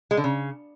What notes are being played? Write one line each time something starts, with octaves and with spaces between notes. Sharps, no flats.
G#3
D3
C#3